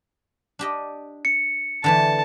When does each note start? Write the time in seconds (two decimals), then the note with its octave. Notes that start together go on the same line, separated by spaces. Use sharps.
0.59 D4 G4 D#5
1.25 C#7
1.84 D3 E3 A3 A5